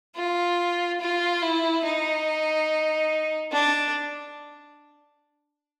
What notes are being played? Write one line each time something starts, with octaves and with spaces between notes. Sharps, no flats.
F4
F4
E4
D#4
D4